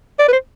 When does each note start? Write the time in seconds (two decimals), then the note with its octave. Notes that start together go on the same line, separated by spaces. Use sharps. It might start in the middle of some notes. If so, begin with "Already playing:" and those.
0.19 D5
0.28 B4
0.33 C5